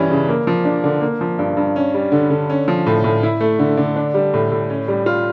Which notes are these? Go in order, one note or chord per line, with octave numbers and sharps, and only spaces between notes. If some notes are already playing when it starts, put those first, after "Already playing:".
Already playing: G2 E3 G3 C#4
C#3
A#3
F3
D4
D3
A#3
F3
G2
G2
C#4
G3
D3
D3
C#4
F3
A2
A2
E4
A3
D3
D3
D4
G3
A2
A2
C#4
G3
F4